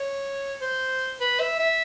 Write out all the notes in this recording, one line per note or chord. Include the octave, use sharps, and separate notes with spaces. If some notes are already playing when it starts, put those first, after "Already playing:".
Already playing: C#5
C5
B4
E5
E5